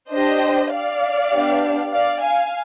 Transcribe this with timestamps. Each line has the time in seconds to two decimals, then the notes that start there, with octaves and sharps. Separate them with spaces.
0.11 D4 G4 C5 D#5
0.72 D5 F5
1.33 B3 D4 G4
1.93 D5 F5
2.23 F5 G#5